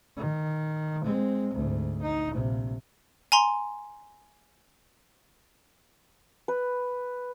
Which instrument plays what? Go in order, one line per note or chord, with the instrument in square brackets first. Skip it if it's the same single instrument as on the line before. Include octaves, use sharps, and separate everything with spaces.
[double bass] D#3
G#3 C4
D2 G#2
D#4
A#1 C3
[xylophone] G#5 A#5 C6
[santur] B4